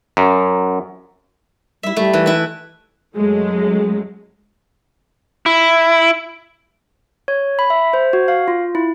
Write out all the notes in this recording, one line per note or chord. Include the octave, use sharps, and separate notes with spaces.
F#2
G3 E4 E5
G3 A3
E3
E4 B4
F#2 F#3 G#3 A3
E4
C#5
B5
E5
C5
F#4
F5
F4
E4